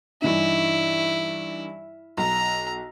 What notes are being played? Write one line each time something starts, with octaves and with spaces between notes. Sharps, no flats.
G2 E3 D#4 E4
B1 A#5